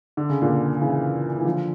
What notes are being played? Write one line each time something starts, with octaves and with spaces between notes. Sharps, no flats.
D3
C#3
A#2 D3
C#3 E3
E3
D3 F3